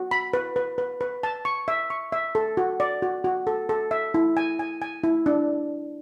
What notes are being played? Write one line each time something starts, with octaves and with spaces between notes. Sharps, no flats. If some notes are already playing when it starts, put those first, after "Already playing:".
Already playing: F#4
B5
B4
B4
B4
B4
A5
C#6
E5
C#6
E5
A4
F#4
D5
F#4
F#4
A4
A4
E5
E4
G#5
G#5
G#5
E4
D4